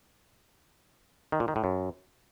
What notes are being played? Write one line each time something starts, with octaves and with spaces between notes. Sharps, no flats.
D#3
A#2
D#3
A2
F#2